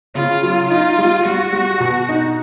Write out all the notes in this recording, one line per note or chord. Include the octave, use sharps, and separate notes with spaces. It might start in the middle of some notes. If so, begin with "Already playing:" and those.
C#3 F4
F#3
D#4 F4
G3
G3 F#4
G3
B2
D#4